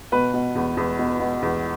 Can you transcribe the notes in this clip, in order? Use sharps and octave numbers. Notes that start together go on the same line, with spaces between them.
B2 B4
B2
E2
E2
B2
B2
E2